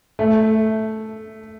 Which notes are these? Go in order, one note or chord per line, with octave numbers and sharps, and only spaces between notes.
A3